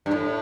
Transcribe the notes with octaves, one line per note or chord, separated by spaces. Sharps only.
G2
A2